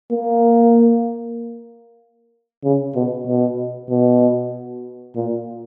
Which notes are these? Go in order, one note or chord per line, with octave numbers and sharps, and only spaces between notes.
A#3
C#3
B2
B2
B2
A#2